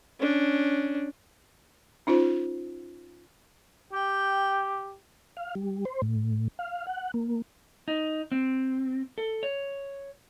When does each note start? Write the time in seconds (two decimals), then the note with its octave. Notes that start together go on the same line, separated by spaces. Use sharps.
0.19 C#4 D4
2.07 C#4 D#4 F4 C5
3.92 G4 G5
5.37 F5
5.55 G3
5.85 C5
6.02 A2
6.59 F5
6.87 F#5
7.14 A#3
7.88 D#4
8.32 C4
9.18 A4
9.43 C#5